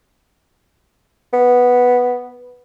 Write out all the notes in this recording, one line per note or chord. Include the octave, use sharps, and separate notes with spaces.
B3